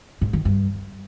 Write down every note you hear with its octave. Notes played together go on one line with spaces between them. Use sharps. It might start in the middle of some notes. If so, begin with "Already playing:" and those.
G#2
D#3
G2